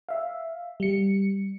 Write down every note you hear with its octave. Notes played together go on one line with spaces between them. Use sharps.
E5 F5
G3 C#7